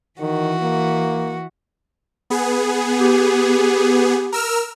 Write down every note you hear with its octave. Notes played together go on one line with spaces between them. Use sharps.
D#3 E3 F#4
A#3
B3 G#4
G4
A#4 E6 F6